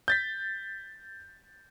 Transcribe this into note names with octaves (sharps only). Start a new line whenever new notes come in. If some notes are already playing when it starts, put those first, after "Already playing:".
G6 A6 B6